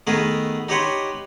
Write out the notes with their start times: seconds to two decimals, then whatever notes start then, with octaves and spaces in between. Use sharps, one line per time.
0.07 D#3 A3 B3 G#4 A#4 B4
0.69 D#4 G4 B4 C#5 F#5 C6